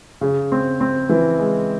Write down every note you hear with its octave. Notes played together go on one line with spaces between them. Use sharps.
C#3
C4
C4
E3
G#3